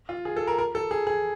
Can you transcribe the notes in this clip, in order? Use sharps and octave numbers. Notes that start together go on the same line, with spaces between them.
F4
G#4
A4
A#4
A#4
A4
G#4
G#4